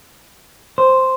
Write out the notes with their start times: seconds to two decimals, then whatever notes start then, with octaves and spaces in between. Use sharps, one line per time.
0.78 C5